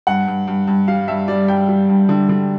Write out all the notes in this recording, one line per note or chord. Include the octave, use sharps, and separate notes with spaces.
G2 F#5
G2
G2
G2
G3 F5
G2 E5
G3 D5
G2 G5
G3
G2
D3
D3